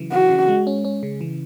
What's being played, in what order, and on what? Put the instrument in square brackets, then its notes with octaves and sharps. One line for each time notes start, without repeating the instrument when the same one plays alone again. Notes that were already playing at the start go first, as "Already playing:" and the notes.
Already playing: [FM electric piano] C#3 E3 F#3
[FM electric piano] E3 [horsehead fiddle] F#4
[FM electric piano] C#3
G#3
C#4
C#4
C#3
E3